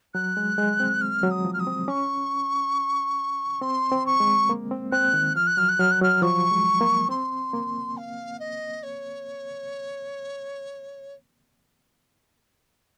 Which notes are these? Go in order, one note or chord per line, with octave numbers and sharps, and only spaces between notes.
F#3 F#6
G#3
G#3
C4
F6
F#3
D#6
F3
F6
D#6
C4
C#4 C#6
C4 C6
C4
C#6
G#3
A#3
C4
C4 F#6
D#3
F3 F6
F#6
F#3 F6
F#6
F#3 F6
F#6
F#3 F6
F3 C#6
G#3
A#3
C4 C6
A#3
F5
D#5
C#5